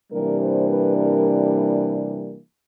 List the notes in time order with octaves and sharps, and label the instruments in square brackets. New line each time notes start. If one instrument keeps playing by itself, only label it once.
[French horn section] C3 E3 G3 A#3 D4 A#4
C5
B4
A#4